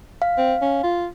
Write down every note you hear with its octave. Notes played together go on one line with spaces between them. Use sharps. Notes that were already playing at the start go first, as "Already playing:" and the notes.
F5
C4
C#4
F4